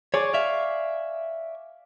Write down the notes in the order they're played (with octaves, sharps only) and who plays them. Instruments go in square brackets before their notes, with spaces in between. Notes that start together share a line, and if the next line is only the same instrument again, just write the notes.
[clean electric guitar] G#4 C#5 [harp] D5 G#5 C#6
[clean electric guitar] D5 E5 [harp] F5